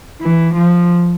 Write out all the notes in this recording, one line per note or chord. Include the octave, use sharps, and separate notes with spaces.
E3
F3